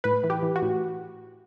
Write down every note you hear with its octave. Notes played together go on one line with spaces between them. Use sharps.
A2 B4
E3
G4
E3
F#4
A2